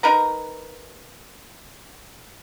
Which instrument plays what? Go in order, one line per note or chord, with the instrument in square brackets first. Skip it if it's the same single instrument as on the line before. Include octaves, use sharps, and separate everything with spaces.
[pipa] D#4 A#4 B4 A#5